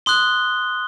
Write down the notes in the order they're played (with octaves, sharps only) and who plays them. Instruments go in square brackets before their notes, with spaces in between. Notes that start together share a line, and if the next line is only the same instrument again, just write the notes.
[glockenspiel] C6 D#6 F#6 G7